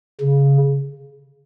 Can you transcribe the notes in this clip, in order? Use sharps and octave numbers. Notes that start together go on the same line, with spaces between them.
C#3